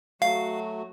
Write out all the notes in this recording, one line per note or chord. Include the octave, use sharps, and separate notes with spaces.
F#3 A3 F#4 F5